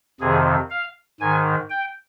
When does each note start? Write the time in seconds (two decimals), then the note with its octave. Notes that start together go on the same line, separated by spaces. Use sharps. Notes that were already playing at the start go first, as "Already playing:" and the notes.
0.20 F2 C3 D#3 G#4
0.70 F5
1.20 G#2 D#3 G#5
1.70 G5